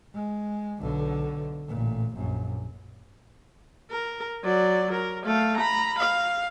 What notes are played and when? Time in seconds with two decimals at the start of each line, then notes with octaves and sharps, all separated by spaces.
0.14 G#3
0.80 B1 D3
1.68 A1 A#2
2.15 A#1 F#2
3.91 A#4
4.44 F#3 D5
4.93 A#4
5.26 A3 F5
5.58 A#5 B5
5.99 F5